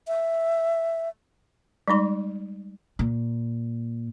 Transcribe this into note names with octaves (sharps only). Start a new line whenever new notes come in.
E5
G3 G#3 D#4 C6
A#2